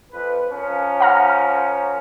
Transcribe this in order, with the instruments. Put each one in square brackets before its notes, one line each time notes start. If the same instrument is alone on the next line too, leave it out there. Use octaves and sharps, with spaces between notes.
[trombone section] F2 B4
F3 C#4 A#4
[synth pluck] F#5 A#5 F6